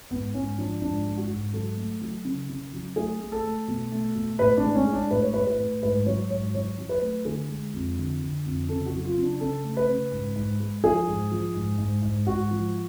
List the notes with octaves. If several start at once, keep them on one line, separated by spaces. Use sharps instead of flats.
G#2 B3
G#2 C#4
F3 D4
G#2 D4
G#3
F#4
G#2
F#3 A4
A3
F#3
C#3
C#3
F#3
A3 G#4
A3
A4
A3
B2
A3
B2
A2 B4
D4
G#3
C#4
G#3
D4
A2 B4
C#5
A2 B4
B4
A2
G#2 B4
F#3 C#5
G#2 C#5
F#3 C#5
F#3
B4
A3
D3 G#4
G#3
F2
D3
D3
F2
C#3 A4
F#4
F#3
F4
C#3
D4
C#3 A4
A3
B4
C#3
G#2
G#2
G#3
F3 G#4
G#2
F3
G#2
G#2
G#2
G#2 F#4
F3